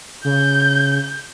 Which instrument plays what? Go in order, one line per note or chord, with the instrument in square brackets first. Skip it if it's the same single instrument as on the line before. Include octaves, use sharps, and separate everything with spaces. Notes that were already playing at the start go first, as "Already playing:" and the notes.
[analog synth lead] C#3 [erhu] G6